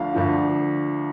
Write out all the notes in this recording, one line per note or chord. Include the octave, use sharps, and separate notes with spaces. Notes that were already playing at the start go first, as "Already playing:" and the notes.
Already playing: D2 D3 F3 F5
D2 D3 F3